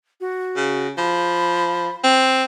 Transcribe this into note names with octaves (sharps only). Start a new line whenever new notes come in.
F#4
C#3
F3 B5
C4